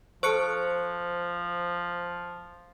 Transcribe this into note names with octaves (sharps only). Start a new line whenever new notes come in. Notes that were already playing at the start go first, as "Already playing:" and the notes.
F3 A4 C5 A5 C#6 F#6 C#7